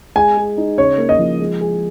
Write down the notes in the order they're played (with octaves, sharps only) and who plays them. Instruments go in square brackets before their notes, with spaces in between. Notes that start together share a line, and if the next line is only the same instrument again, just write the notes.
[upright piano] G#3 [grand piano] G#5
[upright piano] G#4
D#4
[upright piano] C#3 [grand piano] C#5
[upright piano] A#3
[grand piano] D#5
[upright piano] F3
G#3
G#4